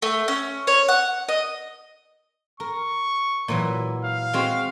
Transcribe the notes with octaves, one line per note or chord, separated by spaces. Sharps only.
A3
C#4
C#5
F#5
D#5
A#4 C#6
A#2 E3 F#3
F5
G#3 C4 F#4